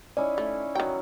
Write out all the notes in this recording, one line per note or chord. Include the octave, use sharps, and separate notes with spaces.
C#4 D#4 E4 D5
A3
D#3 F#3 G5